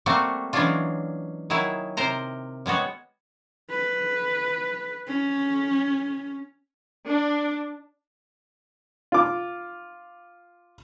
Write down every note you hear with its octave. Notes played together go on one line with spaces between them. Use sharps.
G3 A3 A#3 C4 F#4
E3 F#3 G#3 C#4 D4 F4
D#3 F#3 E4 G#4
C3 A#4 C5 A#5
G3 G#3 B3 F#4 C#5
B4
C#4
D4
F4 D6